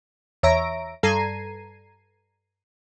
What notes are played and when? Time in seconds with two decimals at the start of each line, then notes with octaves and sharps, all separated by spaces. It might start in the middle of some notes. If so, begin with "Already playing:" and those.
0.43 E2 C#5 E5 A#5 A#6 D7
1.03 G2 A4 A#5 G#6 C7 D#7